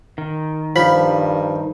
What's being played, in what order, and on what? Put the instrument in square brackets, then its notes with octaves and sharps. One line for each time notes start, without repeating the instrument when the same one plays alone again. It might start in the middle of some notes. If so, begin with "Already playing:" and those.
[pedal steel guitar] D#3
[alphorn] G2 [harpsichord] F3 [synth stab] B5